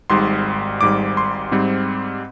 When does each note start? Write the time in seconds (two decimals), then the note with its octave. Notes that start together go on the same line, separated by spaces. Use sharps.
0.10 G#1 G#2 G3 C6
0.81 G#1 G#2 G3 D6
1.17 C6
1.52 G#2 G3 C4